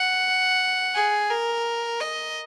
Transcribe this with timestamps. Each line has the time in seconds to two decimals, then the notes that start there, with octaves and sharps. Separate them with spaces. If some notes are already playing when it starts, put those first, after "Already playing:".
Already playing: F#5
0.95 G#4
1.30 A#4
2.00 D#5